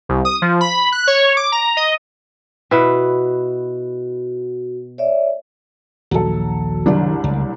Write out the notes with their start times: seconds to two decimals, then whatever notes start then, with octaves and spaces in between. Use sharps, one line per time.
0.09 C2
0.25 D#6
0.42 F3
0.61 B5
0.92 F#6
1.07 C#5
1.37 D6
1.52 A#5
1.77 D#5
2.71 B2 E4 F#4 B4
4.98 C#5 D5 E5
6.11 A#1 D#2 F#3 A4
6.86 F#1 C2 D#3 F#3 D4
7.24 C#2